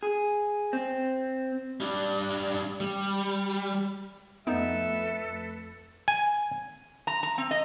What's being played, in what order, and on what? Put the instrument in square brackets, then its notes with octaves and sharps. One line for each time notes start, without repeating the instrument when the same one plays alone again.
[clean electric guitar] G#4
C4
[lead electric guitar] G3 D4
G3
[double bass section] F2 A3 [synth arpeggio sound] B3 D#4 [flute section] A4 B4 [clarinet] E5
[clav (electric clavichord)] G#5
[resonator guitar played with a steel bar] A#5
A#5
C4
D#5